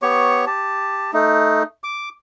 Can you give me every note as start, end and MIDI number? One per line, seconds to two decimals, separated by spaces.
0.02 0.45 59
0.02 0.45 67
0.02 0.45 73
0.02 0.45 85
0.47 1.11 67
0.47 1.11 81
1.13 1.63 57
1.13 1.63 63
1.84 2.09 86